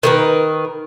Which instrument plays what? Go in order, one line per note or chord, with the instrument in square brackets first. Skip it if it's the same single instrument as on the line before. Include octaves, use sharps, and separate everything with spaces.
[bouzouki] D#3 A#4 B4